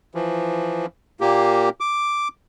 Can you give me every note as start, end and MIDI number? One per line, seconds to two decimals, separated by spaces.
0.15 0.86 52
0.15 0.86 53
1.21 1.69 46
1.21 1.69 58
1.21 1.69 67
1.80 2.28 86